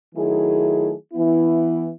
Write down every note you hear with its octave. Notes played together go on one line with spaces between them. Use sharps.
D#3 F#3 A3 E4 G#4
E3 B3 E4